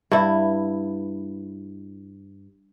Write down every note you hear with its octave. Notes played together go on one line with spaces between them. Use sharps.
G2 E4